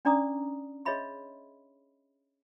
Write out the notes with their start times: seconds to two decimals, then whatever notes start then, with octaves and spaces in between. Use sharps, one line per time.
0.05 C#4 D4 D5 A#5 D6 D#6
0.85 G#4 C#5 D#5 E5 B5 C6